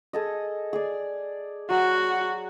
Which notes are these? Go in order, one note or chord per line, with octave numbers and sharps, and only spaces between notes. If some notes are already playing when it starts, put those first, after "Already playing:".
G#4 A4 D#5
G#4 D5
F#3 F#4